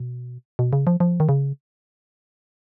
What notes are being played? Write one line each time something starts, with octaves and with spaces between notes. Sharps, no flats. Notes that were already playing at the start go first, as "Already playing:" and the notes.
Already playing: B2
B2
C#3
F3
F3
D#3
C#3